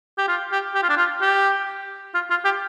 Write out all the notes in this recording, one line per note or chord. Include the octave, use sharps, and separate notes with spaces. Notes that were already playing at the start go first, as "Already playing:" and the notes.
G4
F4
G4
G4
F4
D4
F4
G4
F4
F4
G4